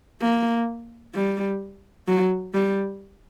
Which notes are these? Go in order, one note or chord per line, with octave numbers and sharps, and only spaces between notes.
A#3
G3
F#3
G3